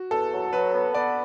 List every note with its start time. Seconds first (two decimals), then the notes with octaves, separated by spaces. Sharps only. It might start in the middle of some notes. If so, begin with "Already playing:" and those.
Already playing: F#4
0.11 E2 A4
0.32 F#3
0.52 F#3 B4
0.73 B3
0.94 B3 D5